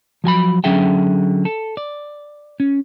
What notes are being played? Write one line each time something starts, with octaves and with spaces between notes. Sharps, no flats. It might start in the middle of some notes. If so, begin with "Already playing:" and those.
F3 F#3 G#5 B5
D3 F#3 C#4 G#4 E5 G5
A4
D5
C#4